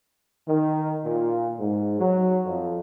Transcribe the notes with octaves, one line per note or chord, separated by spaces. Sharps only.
D#3
A#2
G#2
F#3
F2